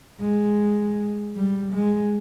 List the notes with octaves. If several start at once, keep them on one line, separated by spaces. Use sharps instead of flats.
G#3
G3
G#3